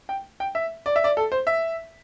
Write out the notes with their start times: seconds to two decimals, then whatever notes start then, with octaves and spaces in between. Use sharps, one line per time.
0.09 G5
0.40 G5
0.55 E5
0.86 D5
0.96 E5
1.04 D5
1.17 A4
1.32 C5
1.47 E5